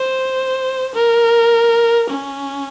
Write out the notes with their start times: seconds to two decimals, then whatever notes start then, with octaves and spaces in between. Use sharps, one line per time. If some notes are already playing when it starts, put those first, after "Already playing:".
Already playing: C5
0.95 A#4
2.10 C#4